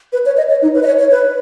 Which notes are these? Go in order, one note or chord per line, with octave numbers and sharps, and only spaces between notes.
B4
C#5
D#5
C#5
D#4
B4
D#5
C#5
C#5
B4